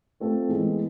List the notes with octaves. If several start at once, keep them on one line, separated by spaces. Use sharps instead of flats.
A3 C4 F4 A4
E3 G#3 B3